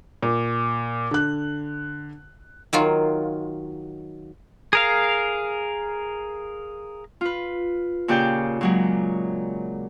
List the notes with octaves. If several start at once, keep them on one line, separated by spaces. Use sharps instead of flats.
A#2
D3 F#6
D#3 F#3 F4
G#4 A#4 F5
F4 B4
A#2 C#3 G4 D5 G5 G6
A#2 F#3 G#3